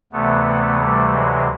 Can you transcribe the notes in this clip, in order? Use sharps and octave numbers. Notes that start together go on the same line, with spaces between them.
D2 C3 E3 A3 B3
G3 A3
F#3 G#3